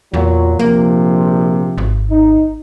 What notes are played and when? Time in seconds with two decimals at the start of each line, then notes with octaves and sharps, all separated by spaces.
0.14 E2 A#2 F#3 F4
0.59 A#1 C3 F3 A#3
1.78 G#1
2.11 D#4